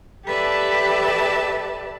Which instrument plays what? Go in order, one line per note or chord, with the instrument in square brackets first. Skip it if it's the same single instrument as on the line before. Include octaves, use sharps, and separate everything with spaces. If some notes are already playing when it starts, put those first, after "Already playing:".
[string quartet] G4 A4 B4 D5 E5 A5